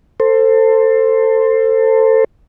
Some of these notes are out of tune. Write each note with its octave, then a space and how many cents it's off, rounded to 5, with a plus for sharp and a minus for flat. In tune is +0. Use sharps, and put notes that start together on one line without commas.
A4 +25 C5 +5